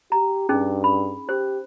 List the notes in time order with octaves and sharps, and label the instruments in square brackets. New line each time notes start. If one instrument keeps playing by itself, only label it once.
[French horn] G4 [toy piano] A#5
[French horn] G2 [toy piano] C#4 D#4 G#4
[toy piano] B5
[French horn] G4 [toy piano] C5